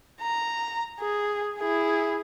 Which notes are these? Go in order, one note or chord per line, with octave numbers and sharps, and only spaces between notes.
A#5
G#4
E4 G#4